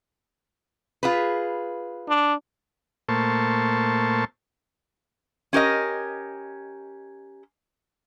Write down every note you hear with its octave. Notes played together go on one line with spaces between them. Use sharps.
F4 G#4 B4
D4
A#2 A3 A#3 C5 A5 C#6
C#4 G4 A#4 D#5